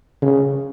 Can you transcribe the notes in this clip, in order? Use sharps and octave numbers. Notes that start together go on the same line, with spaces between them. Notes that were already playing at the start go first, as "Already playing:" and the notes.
C#3